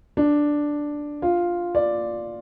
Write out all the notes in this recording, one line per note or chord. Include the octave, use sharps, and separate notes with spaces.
D4
F4
D5